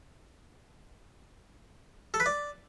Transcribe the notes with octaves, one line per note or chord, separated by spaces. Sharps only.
A4
B4
D5